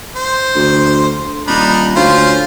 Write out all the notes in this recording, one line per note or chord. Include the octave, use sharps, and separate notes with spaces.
C5
D2
D#1 D4 D#4 B5
D2 C#4 F4 C5